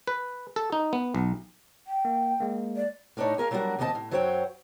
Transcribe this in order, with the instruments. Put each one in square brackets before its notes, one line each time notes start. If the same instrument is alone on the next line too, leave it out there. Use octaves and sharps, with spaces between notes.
[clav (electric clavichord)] B4
A4
D#4
B3
B1
[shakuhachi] G5
[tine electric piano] A#3
G#3 A#3
[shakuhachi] D5
[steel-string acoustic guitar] A2 A3 D4 D#4 C#5
G#4 A#4 E5 F5
F#3 G3 D4 F4 F#4 A#4
D#2 A2 C4 D#5 F5 A5
A2
F#2 F#3 F#4 C5 C#5 G5